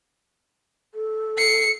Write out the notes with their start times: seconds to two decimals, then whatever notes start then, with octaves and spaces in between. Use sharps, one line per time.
0.95 A4
1.38 C7 C#7